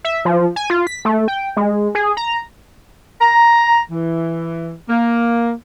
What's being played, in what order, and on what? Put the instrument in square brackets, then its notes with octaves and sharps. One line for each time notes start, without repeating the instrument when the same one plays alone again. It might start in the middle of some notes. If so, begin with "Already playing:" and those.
[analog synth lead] E5
F3
G#5
F4
B6
A3
G5
G#3
G#4
A#5
[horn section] A#5
E3
A#3